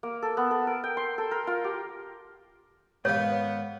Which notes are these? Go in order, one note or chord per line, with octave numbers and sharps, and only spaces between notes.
A#3
A4
B3
A4
A#4
G5
C6
A4
A#4
F4
G4
G#2 D#3 B3 C#5 F5